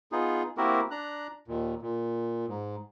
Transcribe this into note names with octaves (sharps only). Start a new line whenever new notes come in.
B3 D#4 F4 G#4
A#3 C4 E4 F#4 G4 A#4
D4 A#5 F#6
D#2 A#2
A#2
G#2